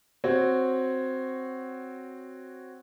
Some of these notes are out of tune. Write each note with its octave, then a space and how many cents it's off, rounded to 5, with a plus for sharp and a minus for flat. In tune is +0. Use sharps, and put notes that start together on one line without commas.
C4 +0 F#4 +0 C#5 +0